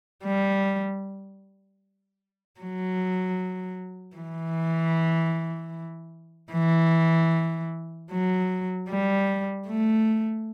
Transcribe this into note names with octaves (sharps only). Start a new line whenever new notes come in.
G3
F#3
E3
E3
F#3
G3
A3